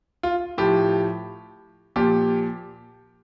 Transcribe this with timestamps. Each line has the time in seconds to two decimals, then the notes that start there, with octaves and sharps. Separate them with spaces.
0.23 F4
0.58 A2 F3 G4
1.96 A#2 F3 G4